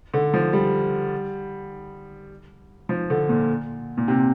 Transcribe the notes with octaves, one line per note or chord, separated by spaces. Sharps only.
D3
F3
G3
F3
D3
A#2
A#2
C3